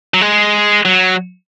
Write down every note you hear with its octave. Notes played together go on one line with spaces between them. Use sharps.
F#3
G#3
F#3